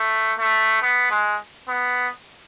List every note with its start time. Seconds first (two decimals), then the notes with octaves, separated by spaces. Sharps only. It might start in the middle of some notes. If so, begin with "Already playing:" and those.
Already playing: A3
0.38 A3
0.82 B3
1.11 G#3
1.68 B3